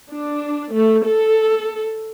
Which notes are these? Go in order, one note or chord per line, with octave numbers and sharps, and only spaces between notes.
D4
A3
A4